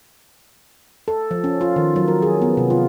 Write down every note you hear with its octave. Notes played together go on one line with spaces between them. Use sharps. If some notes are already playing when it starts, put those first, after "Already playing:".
A4
F3
C#4
F4
D#3
F#3
A#4
G#4
B3
C3
F4